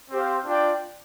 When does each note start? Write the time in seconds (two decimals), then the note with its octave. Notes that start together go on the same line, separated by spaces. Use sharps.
0.10 C4 G4 C5 F5
0.45 D4 F4 D5 G5